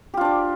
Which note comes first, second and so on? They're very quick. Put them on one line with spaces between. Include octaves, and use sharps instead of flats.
G4 F4 D4 D5